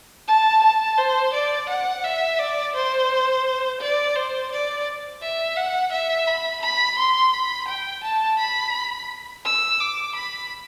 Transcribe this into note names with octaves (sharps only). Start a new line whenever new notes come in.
A5
A5
C5
D5
F#5
E5
D5
C5
D5
C5
D5
E5
F#5
E5
B5
B5
C6
B5
G5
A5
B5
E6
D6
B5